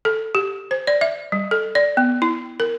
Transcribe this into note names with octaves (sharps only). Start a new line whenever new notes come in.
A4
G4
C5
D5
E5
G3
A4
D5
B3
E4
A#4